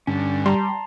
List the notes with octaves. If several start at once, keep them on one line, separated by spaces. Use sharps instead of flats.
G2 D3 C#4
G3 A5 A#5 C6